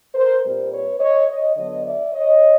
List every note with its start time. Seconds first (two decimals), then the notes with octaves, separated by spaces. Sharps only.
0.15 A#4 C5
0.43 A#2 G3 C4 A#4 C5
0.71 B4 C#5
0.99 C#5 D#5
1.28 C#5 D#5
1.56 D3 F#3 B3 D4 C#5 D#5
1.85 D5 E5
2.13 C#5 D#5